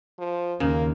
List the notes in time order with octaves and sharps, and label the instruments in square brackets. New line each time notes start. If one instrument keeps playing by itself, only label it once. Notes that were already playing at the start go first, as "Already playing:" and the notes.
[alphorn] F3
[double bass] D#2 [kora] C#3 [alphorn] A#3